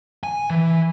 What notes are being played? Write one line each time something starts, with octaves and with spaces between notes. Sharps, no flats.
G#5
E3